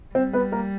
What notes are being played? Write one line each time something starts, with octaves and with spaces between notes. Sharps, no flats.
G3 C4 C5
B3 B4
A#3 A#4